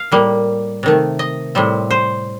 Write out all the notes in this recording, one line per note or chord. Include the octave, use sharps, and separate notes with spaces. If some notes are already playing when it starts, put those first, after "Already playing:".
Already playing: F5
A2 G3 A#3
C3 D#3 A3
D#5
A2 G3 C4
C5